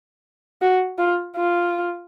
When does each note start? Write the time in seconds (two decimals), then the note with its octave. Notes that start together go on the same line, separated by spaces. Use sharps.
0.62 F#4
0.98 F4
1.36 F4